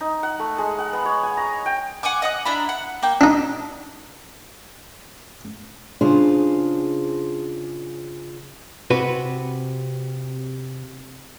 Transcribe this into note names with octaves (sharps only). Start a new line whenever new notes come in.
D#4
F#5
A3
G#3
F#5
B3
C#5
G#5
A#5
G5
F#5 G#5 C#6 D6
D#5 F#5 D#6
D4 E4 A#5 B5
F#5
A#3 G5
D4 D#4
C#3 D4 F4 G#4 C5
C3 F#4 B4